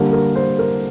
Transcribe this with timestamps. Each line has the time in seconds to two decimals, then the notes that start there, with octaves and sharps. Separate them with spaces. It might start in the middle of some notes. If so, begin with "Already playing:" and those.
Already playing: D3 G3 A#3 A#4
0.13 A#4
0.36 C5
0.59 A#4